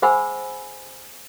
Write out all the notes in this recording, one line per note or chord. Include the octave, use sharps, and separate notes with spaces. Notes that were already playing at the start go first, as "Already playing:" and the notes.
G#4 C5 F#5 G#5 B5 E6